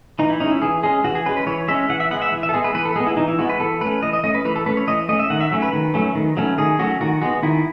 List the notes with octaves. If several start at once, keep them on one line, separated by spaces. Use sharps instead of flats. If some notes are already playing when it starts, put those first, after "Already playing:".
E3 D#4
E4
G#3 C#4 D#4
E4
E3 G#4
G#3 C#4 G#4
E3 F#4
G#4
G#3 C#4 B4
B4
E3 C#5
G#3 C#4 E5
E3 F#5
E5
G#3 B3 F#5
E5
E3
E5
A4
G#3 B3 G#4
B4
E3 B4
A4
G#3 B3 G#4
E4
E3 D#4
E4
G#3 B3 F#4
B4
E3 A4
A3 C#4 B4
E3 D#5
D#5
A3 C#4 D#5
B4
E3 B4
A4
A3 C#4 B4
C#5
E3 D#5
A3 C#4 D#5
E5
D#3 F#5
E5
F#3 A3 C#4
B4
D#3
F#3 A3 C#4
D#3
F#3 A3 C#4
D#3 G#4
F#3 A3 C#4 F#4
D#3 F#4
G#3 B3 F#4
D#3 E4